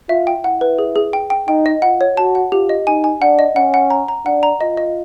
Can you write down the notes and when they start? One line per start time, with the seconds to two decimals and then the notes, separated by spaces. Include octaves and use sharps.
0.09 F4 E5
0.27 G5
0.44 E4 F#5
0.61 B4
0.79 G#4
0.96 G#4
1.13 G5
1.30 G5
1.48 D#4 G5
1.66 D#5
1.82 F4 F#5
2.01 C#5
2.17 F#4 A5
2.35 F#5
2.52 F4 G4
2.69 D#5
2.87 D#4 G#5
3.04 G#5
3.21 D4 F#5
3.39 D#5
3.56 C#4 F#5
3.74 F#5
3.90 A#5
4.08 A#5
4.26 D4 F#5
4.43 A#5
4.61 F4 D#5
4.77 D#5